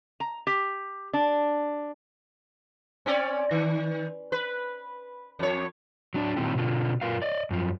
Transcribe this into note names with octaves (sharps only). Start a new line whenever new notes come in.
A#5
G4
D4
C4 C#4 D5
D#3
B4
F2 C#5
F#3 D4 D5
A#2 D#3 F#3 C4 E4 G4
B2 D3 F4
F#2 F4 A#4 B4 F5
D5 D#5
F#2 F3